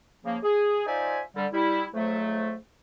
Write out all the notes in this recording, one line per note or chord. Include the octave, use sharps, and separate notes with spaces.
C#3 F3 A#3
G#4
D#4 F4 C5 D5 E5 G#5
D3 G3
G3 E4
F2 G#2 F#3 A3